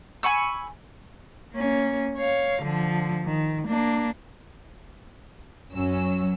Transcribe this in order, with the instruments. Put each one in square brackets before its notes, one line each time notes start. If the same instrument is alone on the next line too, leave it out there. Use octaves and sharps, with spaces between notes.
[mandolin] G#5 B5 C#6 E6
[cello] A#3 C#4
C#5 F5
D3 F3
D#3
A#3 D4
[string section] F#2 F#3 C#4 E6